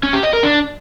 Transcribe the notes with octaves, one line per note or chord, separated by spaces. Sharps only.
C#4
G4
D#5
A#4
D4